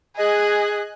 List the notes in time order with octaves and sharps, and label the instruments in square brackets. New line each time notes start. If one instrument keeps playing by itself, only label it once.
[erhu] G#4 [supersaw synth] D#5 G#5 F#6